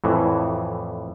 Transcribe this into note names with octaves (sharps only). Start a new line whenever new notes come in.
F2 A2 E3